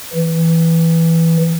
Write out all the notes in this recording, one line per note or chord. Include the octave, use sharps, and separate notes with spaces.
E3